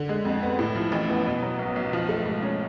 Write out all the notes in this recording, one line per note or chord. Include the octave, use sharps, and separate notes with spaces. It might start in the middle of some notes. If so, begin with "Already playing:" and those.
Already playing: D3
G#3
F2
B3
A2
F3
A1
B3
B2
F#3
B1
B1
F3
A3
G#2
C#4